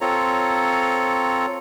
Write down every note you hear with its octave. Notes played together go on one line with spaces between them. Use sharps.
C4 F4 A4 C#5 A#5